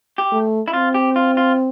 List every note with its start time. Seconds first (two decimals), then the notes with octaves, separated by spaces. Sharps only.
0.18 G4
0.32 A3
0.68 E4
0.73 C4 F4
0.94 G4
1.16 F4
1.37 F4